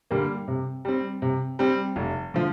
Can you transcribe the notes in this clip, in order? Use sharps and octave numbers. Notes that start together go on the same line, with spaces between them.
D3 G3 A#3
C3
G3 C4
C3
G3 C4
F1
D3 F3